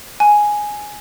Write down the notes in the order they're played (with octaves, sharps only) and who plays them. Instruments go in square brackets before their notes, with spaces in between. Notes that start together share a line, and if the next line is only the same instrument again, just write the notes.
[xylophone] G#5